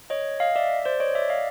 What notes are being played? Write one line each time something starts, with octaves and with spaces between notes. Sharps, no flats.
C#5 D#5
D#5 F5
D5 E5
C5 D5
C#5 D#5
D5 E5
D#5 F5